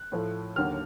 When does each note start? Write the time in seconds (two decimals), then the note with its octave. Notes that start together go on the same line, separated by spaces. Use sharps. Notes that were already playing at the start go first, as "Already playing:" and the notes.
Already playing: F#6
0.12 A2 F3 A3
0.56 D#2 D3 F#3 A#3 F6